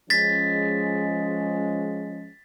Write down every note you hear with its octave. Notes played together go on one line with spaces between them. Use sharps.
F3 G#3 C#4 A6 B6